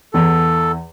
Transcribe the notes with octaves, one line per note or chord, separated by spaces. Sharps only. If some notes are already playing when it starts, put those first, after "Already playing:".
E2 E3 A4